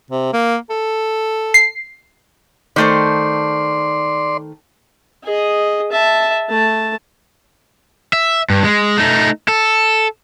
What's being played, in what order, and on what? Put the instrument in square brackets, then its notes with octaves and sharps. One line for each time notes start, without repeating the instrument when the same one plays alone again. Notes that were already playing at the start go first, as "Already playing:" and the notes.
[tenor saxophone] C3
A#3
A4
[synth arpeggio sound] C7
[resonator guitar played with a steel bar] D#3 A3 C5 [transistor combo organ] D5 C6
[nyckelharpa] G#4 D#5
E5 A5
A3 A5
[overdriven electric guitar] E5
G2
G#3
A3 D#4
A4